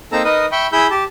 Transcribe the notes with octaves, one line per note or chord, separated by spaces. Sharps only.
A#3 C4 D#4 A4 A#5 E6
D#4 A#4 B4 D#5 D#6
E5 G5 B5 C#6
E4 G#4 B5 E6 G6
G4 A5